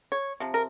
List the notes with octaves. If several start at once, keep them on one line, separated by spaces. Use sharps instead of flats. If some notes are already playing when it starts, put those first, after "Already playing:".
C#5
C3 F3
A#4